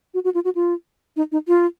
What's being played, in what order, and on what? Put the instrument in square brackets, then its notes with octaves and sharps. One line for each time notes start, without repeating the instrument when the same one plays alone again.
[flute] F#4
F#4
F4
F#4
F4
D#4
D#4
F4